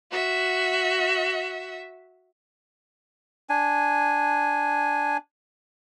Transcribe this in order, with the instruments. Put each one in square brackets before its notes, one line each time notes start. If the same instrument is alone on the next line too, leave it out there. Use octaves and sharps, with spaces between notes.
[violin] F#4 E5
[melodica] D4 G#5